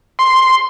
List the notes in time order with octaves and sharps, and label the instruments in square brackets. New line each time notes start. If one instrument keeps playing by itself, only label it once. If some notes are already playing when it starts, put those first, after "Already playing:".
[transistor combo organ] C6